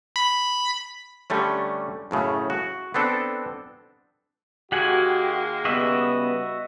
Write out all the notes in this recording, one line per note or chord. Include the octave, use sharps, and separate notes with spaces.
B5
D3 G3 A3 C#4
F#2 A2 C#3 A3
F#4
B3 C4 D4 A4
D#3 G#3 A#3 F#4 G4 F#5 G#5
C#3 G3 B3 F#4 D#5 E5